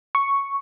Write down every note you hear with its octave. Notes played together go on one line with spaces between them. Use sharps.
C#6